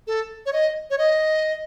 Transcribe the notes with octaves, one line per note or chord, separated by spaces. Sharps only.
A4
C#5
D#5
C#5
D#5